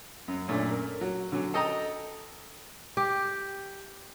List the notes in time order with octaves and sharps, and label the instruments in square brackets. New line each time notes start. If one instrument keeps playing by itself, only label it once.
[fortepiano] F#2
F#2 A#2 A3 C#4 D4
A#4
F#3
D3 F#3 C#4
A4 D#5 G5 A#5
[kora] G4